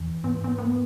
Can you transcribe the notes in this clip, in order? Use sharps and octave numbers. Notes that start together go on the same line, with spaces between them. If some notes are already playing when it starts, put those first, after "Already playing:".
Already playing: E2 E3
G#2 B3
B3
A#3
B3